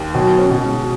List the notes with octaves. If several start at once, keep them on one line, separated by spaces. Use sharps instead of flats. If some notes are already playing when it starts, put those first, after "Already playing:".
Already playing: D#2
B2 F#3
C#4
B2
G#2